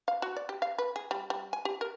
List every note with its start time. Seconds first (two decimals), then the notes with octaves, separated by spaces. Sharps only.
0.08 F5
0.22 F#4
0.36 D5
0.49 G4
0.62 F5
0.78 B4
0.96 G#4
1.11 G3
1.30 G3
1.53 G#5
1.65 G4
1.81 A#4